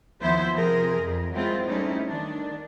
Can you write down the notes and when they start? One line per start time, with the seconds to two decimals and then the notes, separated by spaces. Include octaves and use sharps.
0.20 D#2 F3 B3 E4 C5 E5
0.53 C3 F3 G#4 A#4
0.98 F2
1.33 F#3 G#3 C4 E4 F4
1.66 G3 A3 C#4 D#4 E4
2.05 D#3 D4